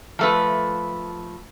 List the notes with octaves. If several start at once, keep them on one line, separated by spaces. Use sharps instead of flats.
F3 A3 B4